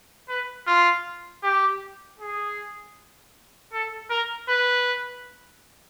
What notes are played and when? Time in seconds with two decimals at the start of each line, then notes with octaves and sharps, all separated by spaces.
0.28 B4
0.67 F4
1.43 G4
2.19 G#4
3.73 A4
4.10 A#4
4.49 B4